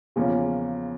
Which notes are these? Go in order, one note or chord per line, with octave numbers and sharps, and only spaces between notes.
E2 C#3 F3 A#3 C#4